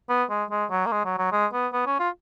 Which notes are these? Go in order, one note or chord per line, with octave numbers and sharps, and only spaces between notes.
B3
G#3
G#3
F#3
A#3
G#3
F#3
F#3
G#3
B3
B3
C#4
F4